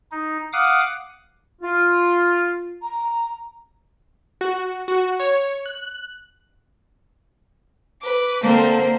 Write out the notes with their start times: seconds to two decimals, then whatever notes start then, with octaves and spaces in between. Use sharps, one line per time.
0.12 D#4
0.53 F5 F#5 D6 D#6
1.62 F4
2.82 A#5
4.41 F#4
4.88 F#4
5.20 C#5
5.66 F#6
8.01 B4 D6
8.42 D3 A#3 C4 A4 C5